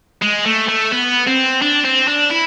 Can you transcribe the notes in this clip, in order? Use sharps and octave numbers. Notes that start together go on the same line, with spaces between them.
G#3
A3
A3
B3
C4
D4
C4
D4
E4